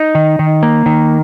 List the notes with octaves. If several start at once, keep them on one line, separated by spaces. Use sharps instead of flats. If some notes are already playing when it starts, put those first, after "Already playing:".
Already playing: D#4
D#3
D#3
A#3
D#3